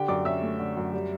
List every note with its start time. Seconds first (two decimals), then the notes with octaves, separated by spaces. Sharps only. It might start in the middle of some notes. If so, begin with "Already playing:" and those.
Already playing: D3 G4 G5
0.08 F#2 D5 D6
0.25 C#4 E5 E6
0.43 A3
0.59 D3
0.77 F#2
0.93 G3